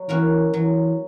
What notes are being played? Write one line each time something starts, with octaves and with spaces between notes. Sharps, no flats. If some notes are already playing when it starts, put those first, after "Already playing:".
Already playing: F#3
E3 A#3 C#4 F#4 A#4
E3 F#3